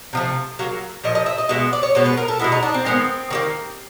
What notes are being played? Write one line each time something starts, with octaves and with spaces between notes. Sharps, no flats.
C3 F3 A3
C#3 F#3 A#3
A#2 F3 D#5
D#5
E5
D#5
B2 G#3 B3 E5
D5
C#5
B2 G#3 B3 C5
B4
A#4
A4
B2 G#3 B3 E4
D#4
D4
C4
D#3 G#3 B3 C4
D#3 G3 A#3